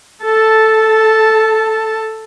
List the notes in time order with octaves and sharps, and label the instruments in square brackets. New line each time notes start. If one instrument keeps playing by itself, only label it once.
[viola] A4 A5